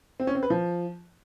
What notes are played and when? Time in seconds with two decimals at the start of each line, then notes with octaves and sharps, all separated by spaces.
0.20 C4
0.27 C#4
0.35 C4
0.43 B4
0.50 F3